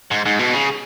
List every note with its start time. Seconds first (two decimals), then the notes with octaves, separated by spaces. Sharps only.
0.11 G#2
0.26 G#2
0.39 B2
0.53 C#3